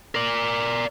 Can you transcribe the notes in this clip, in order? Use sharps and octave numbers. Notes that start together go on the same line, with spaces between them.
A#4 D5